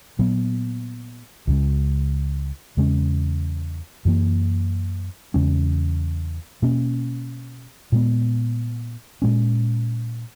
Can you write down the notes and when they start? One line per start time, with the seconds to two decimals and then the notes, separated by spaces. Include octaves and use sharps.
0.19 A#2 F#3 B3
1.47 C#2 C#3 G#3
2.77 E2 C#3 G#3 C#4
4.05 F#2 E3 A#3
5.34 E2 C#3 G#3 C#4
6.62 B2 A#3 C#4
7.92 A#2 G#3 B3
9.22 A#2 G#3 C#4